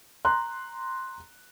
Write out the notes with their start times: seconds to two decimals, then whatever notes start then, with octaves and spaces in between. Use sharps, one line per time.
0.25 A#5 C6 F#6